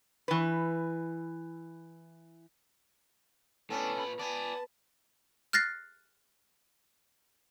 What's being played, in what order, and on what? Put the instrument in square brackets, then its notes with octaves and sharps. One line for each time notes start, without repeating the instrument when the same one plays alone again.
[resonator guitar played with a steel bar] E3 B4
[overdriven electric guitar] A2 D4 [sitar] B3 [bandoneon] C#4 A4
[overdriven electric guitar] A#2 B5
[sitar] B3 [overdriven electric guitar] D5 G#5 [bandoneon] A5
[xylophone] F6 F#6 A6 A#6 C7